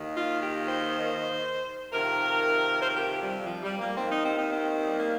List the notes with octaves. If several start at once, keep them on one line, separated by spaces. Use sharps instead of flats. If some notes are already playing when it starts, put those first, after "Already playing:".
Already playing: D#2 D#3
F4
G4
C5
F2 C3 D#3 A#4
C5
A#4
G4
G3
F3
G3
A#3
D#2 D#3 C4
D#4
C4
D#4
C4
G3
A#3